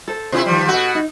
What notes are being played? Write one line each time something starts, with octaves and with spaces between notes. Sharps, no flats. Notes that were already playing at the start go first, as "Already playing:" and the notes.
A4 C5
C3 E3 E4 F4 C5
D#3 F3 G3
B2 F#4 A4 F#5
D#4